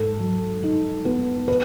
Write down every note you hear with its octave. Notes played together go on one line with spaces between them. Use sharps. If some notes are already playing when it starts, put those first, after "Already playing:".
Already playing: G#2 A4
F#3
D#4
B3
B4